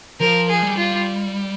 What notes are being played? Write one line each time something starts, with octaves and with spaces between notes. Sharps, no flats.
F3 A#4
G#4
G3
F4